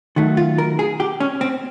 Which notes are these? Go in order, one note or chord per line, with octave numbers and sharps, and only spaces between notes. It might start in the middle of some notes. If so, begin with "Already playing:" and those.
D#3 F#3 A3
F4
A#4
G#4
G4
C#4
C4